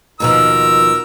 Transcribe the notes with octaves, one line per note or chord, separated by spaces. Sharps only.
D#2 B2 F3 A#4 E6